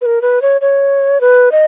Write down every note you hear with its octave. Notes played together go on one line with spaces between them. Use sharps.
B4
A#4
B4
C#5
C#5
B4
D#5